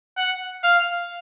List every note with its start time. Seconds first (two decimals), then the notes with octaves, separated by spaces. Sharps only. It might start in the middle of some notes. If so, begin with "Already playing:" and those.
0.18 F#5
0.64 F5